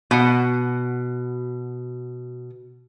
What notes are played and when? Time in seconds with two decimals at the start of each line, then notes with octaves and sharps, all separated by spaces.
0.11 B2 F#5